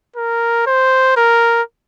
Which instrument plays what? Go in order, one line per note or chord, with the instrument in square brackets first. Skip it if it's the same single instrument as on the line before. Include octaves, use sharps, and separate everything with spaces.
[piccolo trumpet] A#4
C5
A#4